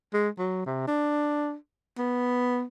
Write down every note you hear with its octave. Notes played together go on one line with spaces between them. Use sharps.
G#3
F#3
C3
D4
B3